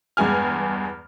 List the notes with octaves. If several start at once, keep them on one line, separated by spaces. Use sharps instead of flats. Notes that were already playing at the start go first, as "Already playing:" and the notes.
E2 G2 G#3 G#5 F6